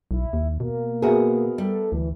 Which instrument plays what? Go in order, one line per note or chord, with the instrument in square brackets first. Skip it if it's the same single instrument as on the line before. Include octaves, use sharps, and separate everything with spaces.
[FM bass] B1 [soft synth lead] E4
[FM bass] D#2
[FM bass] B2 [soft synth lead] A#3
[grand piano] B3 A#4 E5 [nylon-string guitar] F#4 G#4
[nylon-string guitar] G3 [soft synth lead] A4
[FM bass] D2 [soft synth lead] E3